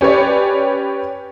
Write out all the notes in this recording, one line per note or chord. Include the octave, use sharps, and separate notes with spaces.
C#4 G4 B4 C#5 D5